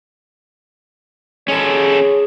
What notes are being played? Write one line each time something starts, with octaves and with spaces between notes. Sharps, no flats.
G#3 C#4 A4 C#5